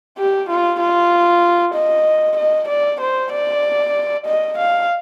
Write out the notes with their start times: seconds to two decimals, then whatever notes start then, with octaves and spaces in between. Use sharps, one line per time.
0.18 G4
0.50 F4
0.80 F4
1.75 D#5
2.37 D#5
2.68 D5
3.01 C5
3.32 D5
4.26 D#5
4.58 F5